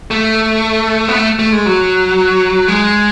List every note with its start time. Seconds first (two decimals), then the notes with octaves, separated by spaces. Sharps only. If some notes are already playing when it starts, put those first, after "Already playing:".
0.11 A3
1.08 B3
1.14 A3
1.39 A3
1.53 G#3
1.66 F#3
2.68 G#3